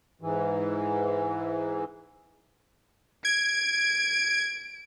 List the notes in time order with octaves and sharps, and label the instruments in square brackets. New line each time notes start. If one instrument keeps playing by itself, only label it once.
[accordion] G#2 E3
[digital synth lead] G#6 [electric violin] D7